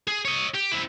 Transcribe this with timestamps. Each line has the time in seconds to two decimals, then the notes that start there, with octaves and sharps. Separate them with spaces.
0.07 G#4
0.25 C#5 D#5
0.55 G4
0.72 C4 E4